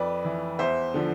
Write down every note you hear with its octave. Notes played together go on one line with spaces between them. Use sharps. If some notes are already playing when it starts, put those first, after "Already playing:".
Already playing: F2 B4 D5
E3
E2 C5 E5
D3 F3